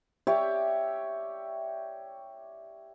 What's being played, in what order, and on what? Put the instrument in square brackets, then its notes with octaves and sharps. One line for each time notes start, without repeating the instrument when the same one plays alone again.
[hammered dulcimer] G4 C#5 D5 E5